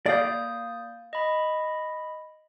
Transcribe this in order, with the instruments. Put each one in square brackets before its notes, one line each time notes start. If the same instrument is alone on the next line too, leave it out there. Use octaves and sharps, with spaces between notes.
[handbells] A#3 D#6 G6 [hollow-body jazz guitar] D5 F5
[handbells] D#5 B5